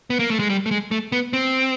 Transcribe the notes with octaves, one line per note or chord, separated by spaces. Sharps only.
B3
A#3
A3
G#3
G3
A3
G#3
A3
B3
C4